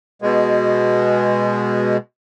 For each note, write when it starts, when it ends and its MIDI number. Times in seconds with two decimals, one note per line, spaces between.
0.22 1.97 47
0.22 1.97 56